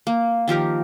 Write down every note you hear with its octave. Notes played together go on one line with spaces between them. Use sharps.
A#3
D#3 F3 G4 A#4